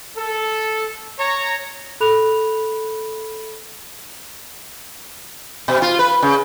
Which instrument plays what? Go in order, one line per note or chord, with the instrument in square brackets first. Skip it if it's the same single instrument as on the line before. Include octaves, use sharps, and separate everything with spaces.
[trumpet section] A4
C#5 A#5
[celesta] A4 B5 F#6 F7
[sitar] B2
F4
B4
C#3